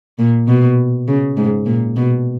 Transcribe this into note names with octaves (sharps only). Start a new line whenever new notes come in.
A#2
B2
C#3
G#2
A#2
B2